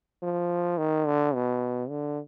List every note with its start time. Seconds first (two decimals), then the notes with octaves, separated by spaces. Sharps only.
0.23 F3
0.78 D#3
1.06 D3
1.34 B2
1.90 D3